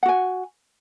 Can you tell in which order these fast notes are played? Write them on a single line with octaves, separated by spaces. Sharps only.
F#5 F#4 G#5